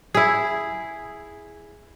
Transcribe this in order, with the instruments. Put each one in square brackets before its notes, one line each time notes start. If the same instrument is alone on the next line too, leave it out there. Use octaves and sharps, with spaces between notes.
[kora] E4 G#4